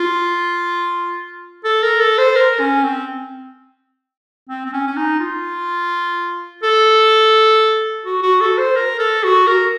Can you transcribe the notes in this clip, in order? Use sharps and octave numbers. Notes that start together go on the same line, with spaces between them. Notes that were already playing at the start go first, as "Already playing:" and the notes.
Already playing: F4
A4
A#4
A4
C5
A#4
C#4
C4
C4
C4
C#4
C#4
D#4
F4
A4
F#4
F#4
A4
C5
A#4
A4
F#4
A#4